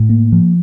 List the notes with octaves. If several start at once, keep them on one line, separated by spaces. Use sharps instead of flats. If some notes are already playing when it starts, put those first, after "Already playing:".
Already playing: A2
A#3
F3